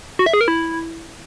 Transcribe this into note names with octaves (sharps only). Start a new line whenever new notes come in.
F#4
E5
G#4
A#4
E4